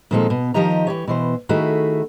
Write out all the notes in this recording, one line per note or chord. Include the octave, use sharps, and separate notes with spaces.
A#2 D#3 F3 G#3 C4 A4
B2
D#3 F3 G4 D#5 A#5
E3 G4 C#5
B2 E3 C5
D#3 A3 E4 F#4 G#4